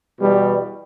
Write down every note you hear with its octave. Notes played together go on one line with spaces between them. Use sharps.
E2 B2 G3